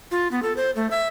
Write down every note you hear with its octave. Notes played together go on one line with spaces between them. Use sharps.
F4
B3
A4
C5
A3
E5